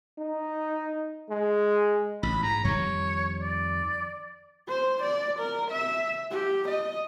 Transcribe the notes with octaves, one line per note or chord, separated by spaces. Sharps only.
D#4
G#3
A1 B5
G#2 A#5
F2 D#3 G3 C#5
D5
C5
D5
A#4
E5
G4
D#5